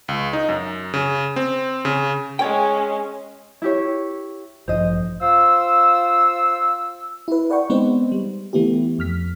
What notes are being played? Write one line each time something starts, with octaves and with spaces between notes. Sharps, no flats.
C#2
D#4
F#2
C#3
C4
C#3
G#3 C#4 C#5 G5
E4 G4 C#5
A1 G2 F3 C5 D#5
F4 C5 E6
E4 B4
B4 D5 F#5 G5 C#6
G#3 B3 C4 D#4 B4 C5
G3
E3 A3 B3 E4 G4
F2 F6 B6